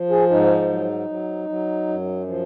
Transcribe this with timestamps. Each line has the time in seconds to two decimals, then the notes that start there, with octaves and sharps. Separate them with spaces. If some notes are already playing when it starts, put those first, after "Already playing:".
Already playing: F3
0.10 G#4
0.30 G#2 D#4
0.69 F#3
1.09 F#3
1.49 F#3
1.88 F#2
2.27 F3